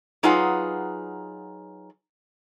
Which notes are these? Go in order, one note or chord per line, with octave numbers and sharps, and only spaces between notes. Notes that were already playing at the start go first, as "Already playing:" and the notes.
F#3 D#4 F4 G#4 B4 F#5